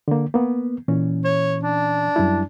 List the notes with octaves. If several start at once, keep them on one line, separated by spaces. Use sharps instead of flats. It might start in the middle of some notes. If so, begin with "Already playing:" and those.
D3 A#3
A#3 B3
A#2 E3 C#4
C#5
D4
F#2 G3 E4